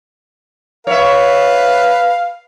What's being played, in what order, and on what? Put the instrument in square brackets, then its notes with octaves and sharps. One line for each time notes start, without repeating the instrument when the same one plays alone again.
[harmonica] B4 F5 [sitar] C#5 E5